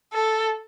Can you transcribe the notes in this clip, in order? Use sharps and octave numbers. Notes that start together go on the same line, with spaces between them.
A4